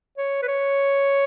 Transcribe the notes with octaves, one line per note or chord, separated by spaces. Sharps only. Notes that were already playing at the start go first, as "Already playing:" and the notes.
C#5
B4
C#5